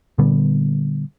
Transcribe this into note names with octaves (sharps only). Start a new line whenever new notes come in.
A#2 D3 G3 B3